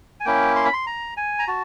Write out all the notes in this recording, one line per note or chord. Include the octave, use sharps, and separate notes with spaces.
G#5
A#3 C#4 E4 G5
C6
B5
C6
A#5
G#5
A#5
F#4 A5